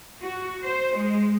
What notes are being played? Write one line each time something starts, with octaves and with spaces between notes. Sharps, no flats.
F#4
C5
G#3